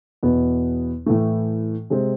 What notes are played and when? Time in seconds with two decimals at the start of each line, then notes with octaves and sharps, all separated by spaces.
0.23 E2 B2 B3
1.06 A2 E3 A3
1.90 C3 G#3 C4